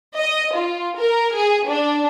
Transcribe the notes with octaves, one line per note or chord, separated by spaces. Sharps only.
D#5
F4
A#4
G#4
D4